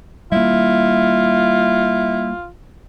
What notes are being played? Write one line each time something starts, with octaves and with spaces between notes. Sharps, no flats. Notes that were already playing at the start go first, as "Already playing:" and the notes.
G3 A#3 E4 F4